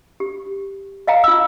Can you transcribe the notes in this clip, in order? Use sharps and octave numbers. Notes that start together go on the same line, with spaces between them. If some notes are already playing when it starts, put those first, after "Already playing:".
G4
D#5 F5 G5 A#5
F4 E6